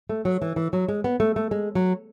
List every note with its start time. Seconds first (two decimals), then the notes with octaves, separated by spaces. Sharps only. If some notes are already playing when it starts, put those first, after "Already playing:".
0.09 A3
0.25 F#3
0.42 E3
0.56 E3
0.73 F#3
0.88 G#3
1.04 B3
1.20 A3
1.36 A3
1.51 G#3
1.75 F#3